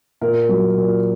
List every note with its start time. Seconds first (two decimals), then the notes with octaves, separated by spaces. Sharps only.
0.21 A#2 A#4
0.49 F#3
0.77 A#2